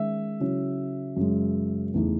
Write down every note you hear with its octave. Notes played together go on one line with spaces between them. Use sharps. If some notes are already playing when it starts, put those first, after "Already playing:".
Already playing: D#3 G#3 C#4 E5
C#3 F#3 C#4 E4
F#2 C#3 G#3
E2 C#3 E3 A3 D#4